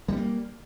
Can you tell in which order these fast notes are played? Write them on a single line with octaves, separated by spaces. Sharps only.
G3 C#4 A#3